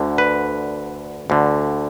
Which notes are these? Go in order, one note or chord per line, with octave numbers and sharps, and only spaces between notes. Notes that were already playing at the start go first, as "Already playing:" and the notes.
Already playing: D2 D3
B4
D2 D3